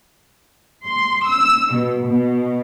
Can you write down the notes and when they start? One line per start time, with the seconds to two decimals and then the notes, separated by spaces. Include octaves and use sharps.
0.87 C6
1.29 E6
1.73 B2
2.05 B2